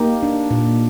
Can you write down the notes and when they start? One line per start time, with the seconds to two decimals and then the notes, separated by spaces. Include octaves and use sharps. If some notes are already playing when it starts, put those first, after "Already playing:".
Already playing: A#3 D#4 G4
0.23 D4
0.51 A#2